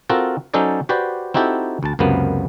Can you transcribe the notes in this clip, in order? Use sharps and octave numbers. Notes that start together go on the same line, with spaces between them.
C4 F4 F#4 A4 A#4
F#3 C#4 D#4 A4 C5 D5
F#4 G4 B4 C5 D5
C4 D#4 E4 F#4 G4 A4
D2 A5
C#2 F#2 C3 A#3 B3